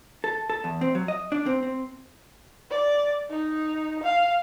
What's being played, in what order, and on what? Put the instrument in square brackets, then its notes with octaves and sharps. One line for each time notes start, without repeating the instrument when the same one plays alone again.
[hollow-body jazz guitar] A4
A4
E2
C4
F#3
D#5
D4
C4
C4
[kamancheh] D5
D#4
F5